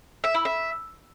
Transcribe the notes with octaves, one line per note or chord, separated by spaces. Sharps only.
E5
E4
E5